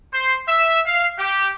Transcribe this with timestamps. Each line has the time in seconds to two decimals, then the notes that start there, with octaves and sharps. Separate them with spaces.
0.13 C5
0.48 E5
0.87 F5
1.18 G4